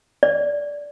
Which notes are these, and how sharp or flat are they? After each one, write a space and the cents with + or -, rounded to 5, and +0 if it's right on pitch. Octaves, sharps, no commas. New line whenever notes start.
D5 -10